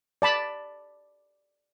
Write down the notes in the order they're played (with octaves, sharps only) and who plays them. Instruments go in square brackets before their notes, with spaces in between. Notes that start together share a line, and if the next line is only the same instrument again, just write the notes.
[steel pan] D5 A5 B5